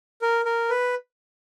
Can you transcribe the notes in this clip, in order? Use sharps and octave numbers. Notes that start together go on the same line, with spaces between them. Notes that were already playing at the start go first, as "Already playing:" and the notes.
A#4
A#4
B4